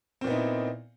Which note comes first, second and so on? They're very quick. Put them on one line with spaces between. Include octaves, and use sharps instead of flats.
C4 A#2 B3 D#4 E4